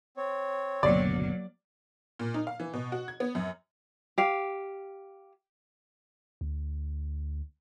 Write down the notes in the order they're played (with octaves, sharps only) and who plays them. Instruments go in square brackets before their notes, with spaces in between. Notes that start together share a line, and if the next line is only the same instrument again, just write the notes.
[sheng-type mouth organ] C4 C#5
[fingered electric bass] F#1 D2 B2 [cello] F#3 A#3 [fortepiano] D5
[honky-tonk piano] A#2
D#4
F5
E3
B2
F#4
G#6
B3
F#2
[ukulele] G4 F5
[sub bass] D2